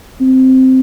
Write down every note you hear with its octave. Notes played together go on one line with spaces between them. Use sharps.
C4